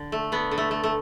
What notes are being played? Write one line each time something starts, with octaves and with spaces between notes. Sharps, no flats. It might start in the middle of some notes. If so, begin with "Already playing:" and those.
Already playing: D3
A3
D3 B3
D3
A3
A3
A3